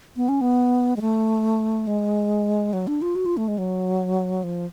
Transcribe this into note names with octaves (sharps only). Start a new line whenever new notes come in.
B3
C#4
B3
G#3
A3
G#3
F#3
D4
F4
F#4
F4
A3
G#3
F#3
F3